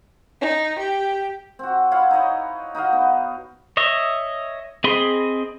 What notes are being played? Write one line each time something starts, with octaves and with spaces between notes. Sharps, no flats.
D#4
G4
C4 F#4
E4 C#5 F5 F#5
D#4 E4 C#5 D#5
D#4 F#4 D#5 F5
B3
C#5 D#5 E5
C4 G#4 D#5 B5 C6